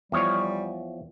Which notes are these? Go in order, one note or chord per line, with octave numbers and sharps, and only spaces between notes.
E2 F3 G3 C#5